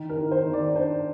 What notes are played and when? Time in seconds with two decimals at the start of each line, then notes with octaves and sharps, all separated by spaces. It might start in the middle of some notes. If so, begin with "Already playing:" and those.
Already playing: D#3
0.10 A#4
0.17 D#3
0.31 C5
0.46 D#3
0.53 D5
0.76 D4 C5